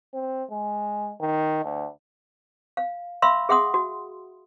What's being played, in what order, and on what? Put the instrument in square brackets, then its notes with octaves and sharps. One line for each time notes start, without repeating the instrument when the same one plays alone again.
[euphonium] C4
G#3
D#3
D2
[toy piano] F5
E5 F5 B5 C6 E6
G#4 E5 F#5 C6 D#6
F#4